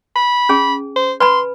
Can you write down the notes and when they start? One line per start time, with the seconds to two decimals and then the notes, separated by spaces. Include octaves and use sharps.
0.16 B5
0.49 C#4 G#4 G#5
0.96 C5
1.20 B4 G#5 B5 C6